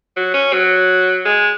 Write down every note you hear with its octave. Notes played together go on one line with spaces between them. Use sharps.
F#3
C#4
F#3
G#3